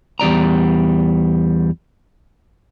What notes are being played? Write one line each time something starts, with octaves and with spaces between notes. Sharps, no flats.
E2 G3 D5 A#5